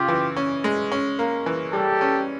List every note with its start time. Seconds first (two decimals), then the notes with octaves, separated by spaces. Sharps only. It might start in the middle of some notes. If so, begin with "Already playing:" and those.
Already playing: C#3 F4 G4
0.08 E3
0.36 C#4
0.64 G#3
0.92 C#4
1.19 A#3
1.46 E3
1.73 G3 G4 A4
2.01 C#4